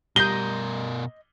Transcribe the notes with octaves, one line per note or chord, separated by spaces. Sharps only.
B2 G3 A#4 D#5 C6 G6 G7